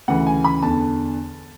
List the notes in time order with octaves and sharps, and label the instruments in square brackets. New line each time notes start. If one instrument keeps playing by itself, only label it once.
[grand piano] D2 C#3 E3 F#5
G#5
B5
E2 D3 A5